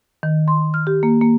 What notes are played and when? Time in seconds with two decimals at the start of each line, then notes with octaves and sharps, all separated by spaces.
0.23 D#3
0.48 C6
0.74 F6
0.87 G4
1.03 A#3
1.21 A#3